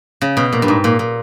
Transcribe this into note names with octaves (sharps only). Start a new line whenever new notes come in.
C#3
B2
A#2
G2
G#2
A#2
A#2